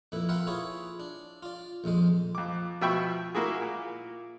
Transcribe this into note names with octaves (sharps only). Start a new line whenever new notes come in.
F2 A#2 E4 B4
F4 A#4 B4 E5 F#5 G5
E4 F4 G#4 B4 C#5
D4
F4 D5
A#1 F2 G#3 C5
F2 D6
B2 F3 E5 G5 B5 C#6
A#3 E4 F#4 G#4
A#2